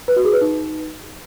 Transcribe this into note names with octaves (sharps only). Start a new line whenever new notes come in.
B4
F#4
G#4
B4
D#4